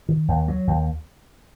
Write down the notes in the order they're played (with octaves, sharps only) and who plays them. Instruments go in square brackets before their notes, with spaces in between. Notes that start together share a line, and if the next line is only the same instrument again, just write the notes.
[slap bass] D#3
D#2
F#3
D#2